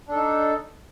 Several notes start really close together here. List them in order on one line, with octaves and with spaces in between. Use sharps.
D4 A4 D#4